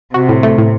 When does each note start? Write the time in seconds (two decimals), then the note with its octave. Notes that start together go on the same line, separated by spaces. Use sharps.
0.14 C3 F#4
0.29 A2
0.43 A3
0.58 A2